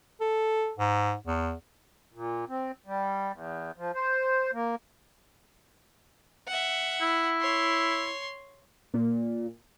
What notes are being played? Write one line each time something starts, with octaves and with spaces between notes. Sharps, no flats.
A4
G#2
E2
A#2
C4
G3
E2
F3
C5
A#3
E5 F#5
E4
C#5 C6
A#2